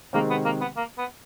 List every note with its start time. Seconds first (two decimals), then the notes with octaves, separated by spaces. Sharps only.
0.13 C3 D#3 G#3 A#3 C4
0.30 B3
0.45 A#3
0.61 B3
0.77 A#3
0.98 B3